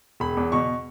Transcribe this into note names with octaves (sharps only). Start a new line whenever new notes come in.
E1 B5
E2
B2 C#6